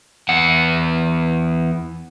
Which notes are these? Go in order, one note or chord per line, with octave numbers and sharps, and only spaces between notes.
E2 F#5